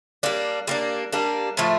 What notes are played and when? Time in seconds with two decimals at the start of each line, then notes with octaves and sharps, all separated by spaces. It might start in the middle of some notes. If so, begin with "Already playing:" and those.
0.23 G3 A#3 D4
0.67 G3 A#3 D4
1.12 G3 A#3 D4
1.57 A2 F3 A3